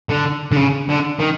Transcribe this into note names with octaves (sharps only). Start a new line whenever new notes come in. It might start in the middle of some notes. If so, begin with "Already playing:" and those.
D3
D3
C#3
D3
D#3